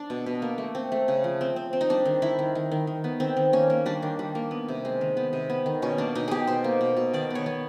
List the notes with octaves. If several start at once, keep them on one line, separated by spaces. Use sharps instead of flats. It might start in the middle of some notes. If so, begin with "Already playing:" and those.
Already playing: D4
B2
B2
A#3
A3
C4
A3
C#3
F3
C4
C4
C4
D#4
G3 D4
D#3
D#3 E4
D#3
D#3
D#3
D#3
B3
D#3 C4
D#3
A#3 C#4
A#3
G3 D4
D#3
G3
A#3
B3
C3
G#3
D#3
B3
C3
B3
D#3
B2 C#4
A#3 D4
B2 D#4
B2 G4 G#4
B2 C5
A#3
B2
B2
D#3 D5
B3 C#5
B3